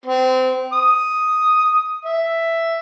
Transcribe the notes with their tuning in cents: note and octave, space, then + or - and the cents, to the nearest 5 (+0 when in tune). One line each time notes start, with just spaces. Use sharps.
C4 -25
D#6 +5
E5 +5